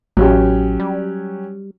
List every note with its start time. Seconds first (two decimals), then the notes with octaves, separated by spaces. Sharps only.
0.17 A1 F#3 C#4 G4
0.79 G3